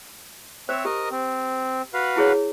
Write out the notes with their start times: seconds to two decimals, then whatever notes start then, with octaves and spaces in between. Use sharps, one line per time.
0.69 C4 C5 C#5 E5
0.85 G4 A#4 D#5
1.11 C4
1.94 F#4 B4 F5
2.16 E4 G#4 C#5